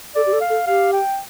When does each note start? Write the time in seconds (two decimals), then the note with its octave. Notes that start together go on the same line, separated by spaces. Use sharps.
0.15 A4 D5
0.26 G4
0.33 A4
0.41 F5
0.50 A4
0.67 G4 F5
0.93 G5